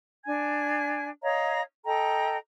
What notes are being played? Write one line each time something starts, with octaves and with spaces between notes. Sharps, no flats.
D4 G#5 G#6
C#5 D#5 F5 A#5
A4 D#5 G5 A#5